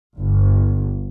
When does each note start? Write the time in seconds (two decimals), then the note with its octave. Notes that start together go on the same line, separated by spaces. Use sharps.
0.18 G1